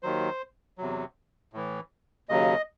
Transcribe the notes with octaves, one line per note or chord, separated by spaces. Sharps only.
D#2 D#3 F#3 C5
E2 C3 F#3
A2 E3
D#2 C#3 F#3 D#5